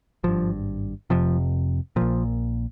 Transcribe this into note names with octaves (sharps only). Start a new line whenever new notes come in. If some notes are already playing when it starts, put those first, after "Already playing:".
G#1 G2 F3
F1 F2 C3 F3
A#1 A#2 F3